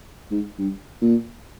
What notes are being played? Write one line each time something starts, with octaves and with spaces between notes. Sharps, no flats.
G#2
G2
A#2